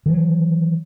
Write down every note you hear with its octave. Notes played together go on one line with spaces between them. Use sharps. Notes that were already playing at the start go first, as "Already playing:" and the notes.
D#3 E3 F#3